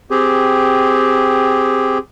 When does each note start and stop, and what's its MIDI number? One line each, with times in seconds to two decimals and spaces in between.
0.11 1.98 60
0.11 1.98 67
0.11 1.98 68